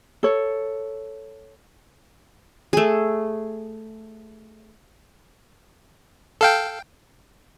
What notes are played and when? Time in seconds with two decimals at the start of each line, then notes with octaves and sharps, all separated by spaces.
0.23 A4 C#5
2.73 A3 G#4
6.41 A4 F5 G5